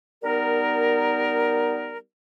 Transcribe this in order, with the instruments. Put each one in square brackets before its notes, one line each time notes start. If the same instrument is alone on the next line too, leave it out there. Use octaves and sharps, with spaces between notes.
[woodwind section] G3 B3 D#4 A#4